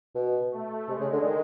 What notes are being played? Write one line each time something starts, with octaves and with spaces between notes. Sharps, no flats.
B2
A3
C3 G#3
C#3
D3
D#3